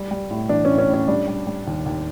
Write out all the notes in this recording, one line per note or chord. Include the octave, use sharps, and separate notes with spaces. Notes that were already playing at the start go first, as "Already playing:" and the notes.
Already playing: G3
G3
A2
E3 D4
C#4
A2
C#4
A2
C#4
G3 D4
G3
G3
D#2
D#2